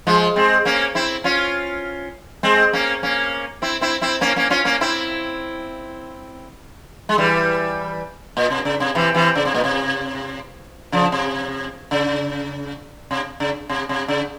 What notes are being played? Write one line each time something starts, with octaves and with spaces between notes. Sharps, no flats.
F3 G#3
G#3 C4
A#3 C#4
C4 E4
C#4 F4
G#3 C4
A#3 C#4
A#3 C#4
C4 E4
C4 E4
C4 E4
A#3 C#4
A#3 C#4
C#4 F4
A#3 C#4
C4 E4
G#3
E3 G3
A#2
C3
C#3
C3
C3 E3
C3 E3
C#3
C3
A#2
C3
C#3 F3
C3
C#3
C3
C#3
C3
C3
C#3